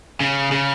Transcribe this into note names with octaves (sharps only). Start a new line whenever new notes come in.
C#3
C#3